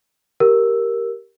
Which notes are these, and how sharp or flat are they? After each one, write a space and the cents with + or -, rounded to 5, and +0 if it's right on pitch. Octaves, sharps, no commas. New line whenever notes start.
G4 -5 A#4 +0 E6 +0